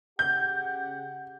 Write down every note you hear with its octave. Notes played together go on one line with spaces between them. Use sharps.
C#3 G4 F#5 G6